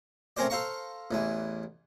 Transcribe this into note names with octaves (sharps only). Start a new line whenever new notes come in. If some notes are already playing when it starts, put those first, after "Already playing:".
A3 C4 C#4 A#4 C5 D5
A4 C5 F5 A#5 C#6
A1 E2 E3